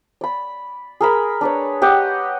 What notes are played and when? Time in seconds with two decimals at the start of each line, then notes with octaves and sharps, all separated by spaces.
0.21 D5 B5
1.01 G#4 A#4 B5
1.41 D4 B4 C#5
1.82 G4 D#5 F#5